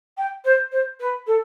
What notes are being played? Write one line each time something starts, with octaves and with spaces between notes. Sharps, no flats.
G5
C5
C5
B4
A4